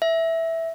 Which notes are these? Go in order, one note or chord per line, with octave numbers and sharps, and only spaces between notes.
E5